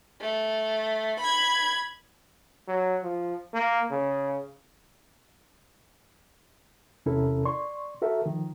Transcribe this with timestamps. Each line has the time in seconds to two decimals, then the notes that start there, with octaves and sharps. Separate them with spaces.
0.21 A3
1.20 B5 G#6
2.68 F#3
3.03 F3
3.54 A#3
3.91 C#3
7.06 E2 C3 C#4 E4 A4 A#4
7.45 D5 C6 C#6
8.02 F#4 A4 A#4 E5
8.26 D#3 F3